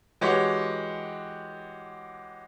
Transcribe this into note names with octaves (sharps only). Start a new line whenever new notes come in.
E3 G#3 F#4 G4 C#5